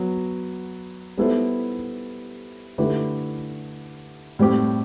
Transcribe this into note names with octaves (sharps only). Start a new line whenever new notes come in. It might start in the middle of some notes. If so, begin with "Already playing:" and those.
Already playing: F#3 B3
G3 B3 E4 A4 C5
D3 A3 E4 G4 B4
A2 G3 C4 G4